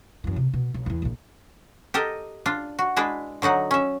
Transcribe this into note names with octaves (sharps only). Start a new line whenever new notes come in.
F#2 E3
C3
B2
B1
E2 E3
A#1 A#2
G4 A4 A#4 D#5
D4 F4
F#4
G#3 D4 E4 B4
D3 F#3 D#4 F#5
C#4 E5